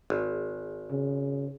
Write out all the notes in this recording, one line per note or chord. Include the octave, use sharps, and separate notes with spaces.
G#1
C#3